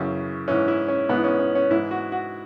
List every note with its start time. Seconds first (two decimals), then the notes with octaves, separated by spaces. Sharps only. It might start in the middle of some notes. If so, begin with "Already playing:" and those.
Already playing: F#2 C#3 E3
0.48 G#2 E3 C#4
0.68 E4
0.88 C#4
1.09 G#2 E3 B3
1.24 C#4
1.39 C#4
1.55 C#4
1.71 G#2 E4
1.76 E3
1.91 F#4
2.12 F#4